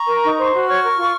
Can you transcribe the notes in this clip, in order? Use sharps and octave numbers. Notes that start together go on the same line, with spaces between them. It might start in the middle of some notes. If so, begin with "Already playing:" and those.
Already playing: A#5 C#6
A#4
D#4
C5
F#4
C#5 C#6 F6
A#4
F4